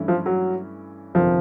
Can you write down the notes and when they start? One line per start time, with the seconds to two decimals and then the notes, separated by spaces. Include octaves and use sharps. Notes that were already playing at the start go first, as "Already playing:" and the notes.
Already playing: G2 E3 A3 C#4 E4
0.08 F3
0.26 F#3
1.14 G1 F2 C3 D#3 F3